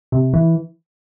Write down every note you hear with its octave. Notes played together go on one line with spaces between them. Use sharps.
C3
E3